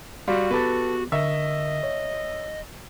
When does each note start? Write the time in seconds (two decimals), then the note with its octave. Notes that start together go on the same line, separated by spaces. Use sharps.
0.28 G3 F#4 D5 F5 C6
0.51 B3 G4 A4 B4 D6
1.12 D3 A#4 D#5 E5 C#6
1.83 C#5